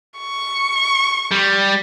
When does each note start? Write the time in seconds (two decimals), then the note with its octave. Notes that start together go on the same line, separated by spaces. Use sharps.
0.18 C#6
1.32 G3